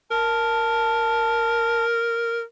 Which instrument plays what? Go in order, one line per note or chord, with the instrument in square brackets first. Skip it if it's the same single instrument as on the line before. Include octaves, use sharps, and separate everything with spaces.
[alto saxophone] A#4 [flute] A5